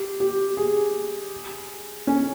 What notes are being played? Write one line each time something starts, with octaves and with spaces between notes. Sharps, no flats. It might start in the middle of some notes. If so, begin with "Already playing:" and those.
Already playing: G4
G4
G#4
C#4